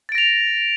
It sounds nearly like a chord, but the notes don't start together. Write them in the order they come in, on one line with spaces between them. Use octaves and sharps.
A6 D7 A#6 F7